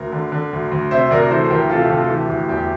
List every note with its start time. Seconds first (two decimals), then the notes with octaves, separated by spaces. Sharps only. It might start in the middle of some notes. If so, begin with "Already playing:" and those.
Already playing: D2 A#4
0.12 D3
0.32 D3
0.53 D2
0.72 D2
0.91 C3 C5 E5
1.11 D2 A#4 D5
1.30 E3 A4 C5
1.45 C5
1.50 D2 G4 A#4
1.70 C3 F4 A4
1.82 G4
1.89 D2 F4 A4
2.04 A4
2.09 E3 G4
2.28 D2 G4
2.48 E2 G4